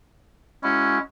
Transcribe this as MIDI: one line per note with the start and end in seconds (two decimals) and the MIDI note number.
0.63 0.99 56
0.63 0.98 61
0.63 0.99 64
0.63 0.99 66